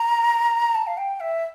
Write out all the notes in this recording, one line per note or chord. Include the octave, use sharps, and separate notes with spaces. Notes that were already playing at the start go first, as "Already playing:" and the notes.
Already playing: A#5
A5
F5
G5
E5